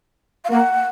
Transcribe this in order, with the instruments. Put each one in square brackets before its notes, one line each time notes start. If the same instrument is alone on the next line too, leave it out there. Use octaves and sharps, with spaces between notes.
[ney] F5
[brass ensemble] A#3 [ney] F#5